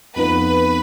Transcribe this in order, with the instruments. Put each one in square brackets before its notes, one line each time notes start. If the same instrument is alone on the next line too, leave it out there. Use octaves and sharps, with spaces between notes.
[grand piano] F2 F3 B3 D#4 [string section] B4